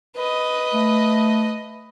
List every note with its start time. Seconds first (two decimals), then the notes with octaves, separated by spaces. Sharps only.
0.16 B4 D#5
0.74 A3